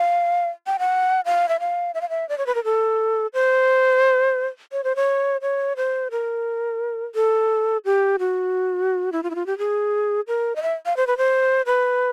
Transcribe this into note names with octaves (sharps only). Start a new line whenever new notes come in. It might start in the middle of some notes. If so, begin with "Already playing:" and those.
Already playing: F5
G5
F#5
F5
E5
F5
E5
F5
E5
D5
C#5
B4
A#4
A4
C5
C#5
C5
C#5
C#5
C5
A#4
A4
G4
F#4
E4
F4
E4
F4
G4
G#4
A#4
D#5
E5
F5
C5
B4
C5
B4